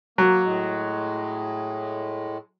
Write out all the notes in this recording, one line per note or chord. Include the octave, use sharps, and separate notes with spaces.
F#3 A#3
A2 G#3